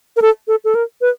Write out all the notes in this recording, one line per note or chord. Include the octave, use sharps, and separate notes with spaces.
A#4
A4
A4
A4
A#4
B4